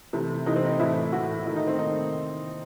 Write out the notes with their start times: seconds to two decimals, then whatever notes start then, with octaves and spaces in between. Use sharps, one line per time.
0.13 C3 E3 A3
0.46 C3 E3 A3 D#4
0.56 C4
0.66 D#4
0.80 A2 E3 A3 E4
1.12 A2 E3 A3 F#4
1.46 D#3 A3 E4
1.56 D#4
1.67 C4
1.78 D#3 A3 D#4